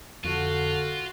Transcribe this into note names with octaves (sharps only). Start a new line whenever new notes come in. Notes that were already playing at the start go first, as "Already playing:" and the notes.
F2 D3 F4 F#4